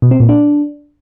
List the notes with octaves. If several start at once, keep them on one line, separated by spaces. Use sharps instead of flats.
B2
C4
A#2
D4